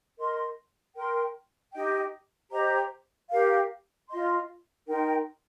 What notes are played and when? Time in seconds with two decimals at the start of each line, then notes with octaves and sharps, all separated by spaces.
0.17 A#4 D#5 C6
0.95 A#4 G5 C6
1.73 D#4 G4 D#5 G5
2.51 G4 C5 D#5 A#5
3.29 G4 A#4 F5
4.08 F4 D#5 C6
4.86 D#4 A#4 G5 C6